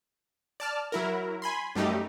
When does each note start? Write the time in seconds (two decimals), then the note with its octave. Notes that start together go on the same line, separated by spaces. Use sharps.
0.60 D5 A5 F6
0.92 F#3 E4 A#4
1.42 G#5 B5 C6
1.75 F#2 G3 A3 D#4 G4